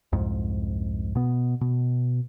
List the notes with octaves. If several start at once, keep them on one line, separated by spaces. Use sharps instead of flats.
C2 F2 G#2
B2 B3
B2